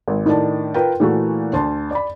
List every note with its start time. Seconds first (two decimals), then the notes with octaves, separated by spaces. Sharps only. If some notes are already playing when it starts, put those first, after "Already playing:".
0.08 G#1
0.26 A2 D#3 D4 D5 A5
0.74 F4 A#4 B4 G5
1.00 A#2 E3 A3 A#3 F#4
1.53 D2 A5 C6
1.91 D5 B5